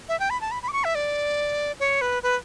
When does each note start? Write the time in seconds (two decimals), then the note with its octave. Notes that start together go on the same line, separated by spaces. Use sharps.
0.09 E5
0.20 G5
0.30 B5
0.41 A5
0.51 B5
0.63 B5
0.68 D6
0.73 C#6
0.84 E5
0.95 D5
1.80 C#5
2.01 B4
2.23 B4